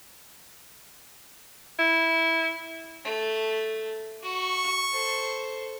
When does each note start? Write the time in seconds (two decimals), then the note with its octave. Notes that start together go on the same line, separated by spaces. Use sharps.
1.79 E4
3.05 A3
4.23 F#4 C#6
4.92 A4 C5